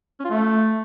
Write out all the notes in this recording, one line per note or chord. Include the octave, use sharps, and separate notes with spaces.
C#4
F4
A3